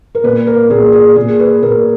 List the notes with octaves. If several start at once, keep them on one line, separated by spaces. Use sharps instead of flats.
A#4
A#2 B4
A#4
A#2 G#4
G#4
A#2 G#4
B4
A#2 A#4